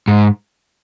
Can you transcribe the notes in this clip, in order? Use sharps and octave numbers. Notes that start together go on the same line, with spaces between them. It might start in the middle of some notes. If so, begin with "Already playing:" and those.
G#2